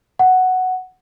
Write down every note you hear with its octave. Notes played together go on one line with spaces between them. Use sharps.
F#5